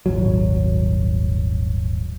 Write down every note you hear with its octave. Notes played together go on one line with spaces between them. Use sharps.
D#1 G#1 F#3